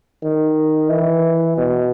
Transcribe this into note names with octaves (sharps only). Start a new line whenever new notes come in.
D#3
E3
B2